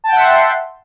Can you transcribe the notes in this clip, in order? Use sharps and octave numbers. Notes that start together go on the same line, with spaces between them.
E5 F#5 G5 A5 C6